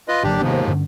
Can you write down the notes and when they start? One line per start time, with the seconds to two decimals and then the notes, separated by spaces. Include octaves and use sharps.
0.08 F4 B4 D#5
0.23 G#1 D#2 D3 F#3 D4 G4
0.41 D#2 G#2 C3 D#3 F3 B3
0.67 G2 D3 C#4